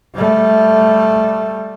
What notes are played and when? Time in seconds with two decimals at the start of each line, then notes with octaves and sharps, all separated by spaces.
0.15 G3 A3